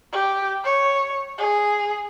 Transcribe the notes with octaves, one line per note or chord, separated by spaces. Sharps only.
G4
C#5
G#4